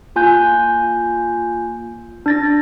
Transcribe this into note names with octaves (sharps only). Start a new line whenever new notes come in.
A#3 F4 G#5 F#6 G6
D4 A6 A#6